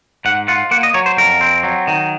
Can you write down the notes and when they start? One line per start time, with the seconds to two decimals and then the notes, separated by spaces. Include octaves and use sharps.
0.25 G#2 F#5
0.48 F4 F#5
0.71 A#3 F#5
0.83 D#5
0.94 F#3 C#5
1.06 C5
1.17 F2 A#4
1.41 C4
1.63 F#3
1.88 D#3